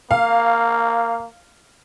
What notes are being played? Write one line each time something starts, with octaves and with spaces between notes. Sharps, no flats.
A#3 F5